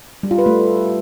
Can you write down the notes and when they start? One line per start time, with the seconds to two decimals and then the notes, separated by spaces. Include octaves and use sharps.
0.23 G3
0.31 F4
0.38 B4
0.46 A3